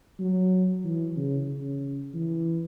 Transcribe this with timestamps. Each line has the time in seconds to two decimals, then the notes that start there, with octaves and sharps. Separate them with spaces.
0.19 F#3
0.84 E3
1.16 C#3
1.49 C#3
2.14 E3